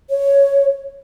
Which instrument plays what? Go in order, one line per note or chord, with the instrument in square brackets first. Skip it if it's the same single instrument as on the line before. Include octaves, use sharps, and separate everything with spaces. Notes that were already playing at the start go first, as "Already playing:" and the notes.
[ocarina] C#5